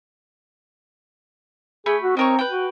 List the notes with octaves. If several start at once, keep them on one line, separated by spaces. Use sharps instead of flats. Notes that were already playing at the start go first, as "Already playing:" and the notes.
A3 G#4 B5
F#4
C4 D#4 A#4 C#5
B4 G5
F#4